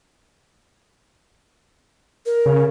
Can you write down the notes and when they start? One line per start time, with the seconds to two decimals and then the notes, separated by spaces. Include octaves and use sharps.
2.26 A#4
2.46 C#3